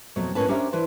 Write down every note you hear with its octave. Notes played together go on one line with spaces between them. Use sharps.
F2 B2 F#3 A3
F2 A2 C#4 A#4 B4 A5
C#4 D4 G4 A#4 C5 E5
E3 B4 C5 D5 A5